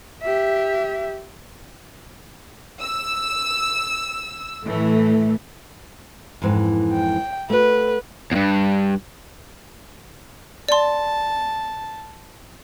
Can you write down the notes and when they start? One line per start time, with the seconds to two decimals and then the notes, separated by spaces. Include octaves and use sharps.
0.22 G4 E5
2.82 E6
4.65 A2 E3 A3
6.42 F2 G#2 E3
6.93 G5
7.50 A3 F#4 B4
8.32 E2 G2
10.69 D5 A5 C6